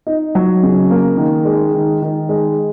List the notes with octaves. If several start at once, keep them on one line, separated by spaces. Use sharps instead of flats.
D#4
F#3
C#3
A#3
D#3
G#3
D#3
D#3
G#3